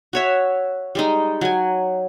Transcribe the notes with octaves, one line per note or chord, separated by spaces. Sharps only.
F#4 C#5 E5
G3 G#3 D#4
F#3 G#5